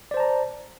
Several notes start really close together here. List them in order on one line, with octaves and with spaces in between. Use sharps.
D5 C5 A5 A#5